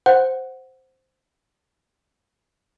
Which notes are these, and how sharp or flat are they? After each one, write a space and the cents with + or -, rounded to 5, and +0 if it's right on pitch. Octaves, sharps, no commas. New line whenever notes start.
C5 +0 F#5 +0